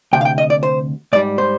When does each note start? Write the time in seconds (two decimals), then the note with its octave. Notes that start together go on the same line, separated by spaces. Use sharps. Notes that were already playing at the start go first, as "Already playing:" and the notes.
0.13 D2 C3 G5
0.21 F5
0.25 G5
0.38 D#5
0.50 D5
0.63 C5
1.13 G#2 D5
1.16 G3
1.38 C5